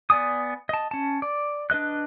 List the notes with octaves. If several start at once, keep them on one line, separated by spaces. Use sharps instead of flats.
B3 D5 G#5 D#6
D#5 A5
C#4 A5
D5
D4 B4 D#5 F#6